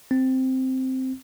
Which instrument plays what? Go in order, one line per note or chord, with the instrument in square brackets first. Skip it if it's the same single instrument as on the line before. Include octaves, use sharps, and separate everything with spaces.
[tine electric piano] C4